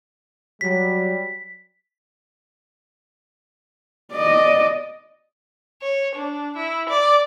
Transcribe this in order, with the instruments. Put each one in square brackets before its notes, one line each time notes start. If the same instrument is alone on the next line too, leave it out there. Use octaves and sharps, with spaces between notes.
[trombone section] F#3 G3 [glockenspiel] B6
[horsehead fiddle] D5 D#5
[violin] C#5
D4
E4
D5